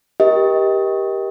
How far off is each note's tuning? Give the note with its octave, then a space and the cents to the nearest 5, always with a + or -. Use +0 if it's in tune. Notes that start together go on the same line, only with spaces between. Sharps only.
G4 +0 A#4 +25 D#5 +25